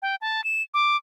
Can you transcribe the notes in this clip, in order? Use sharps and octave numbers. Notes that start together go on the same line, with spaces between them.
G5
A5
E7
D6